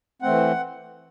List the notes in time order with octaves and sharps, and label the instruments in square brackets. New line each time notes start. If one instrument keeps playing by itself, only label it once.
[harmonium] E3 A3 C4 F#5